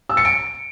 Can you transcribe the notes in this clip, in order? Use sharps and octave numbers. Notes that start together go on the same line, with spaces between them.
E6
C#7
D7